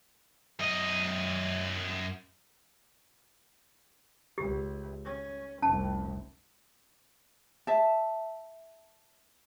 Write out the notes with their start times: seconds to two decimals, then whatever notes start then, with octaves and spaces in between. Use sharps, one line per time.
0.59 F#2 D#5
4.38 C#2 G4
5.05 C#4
5.62 F1 C2 C#4 A5
7.67 E5 A5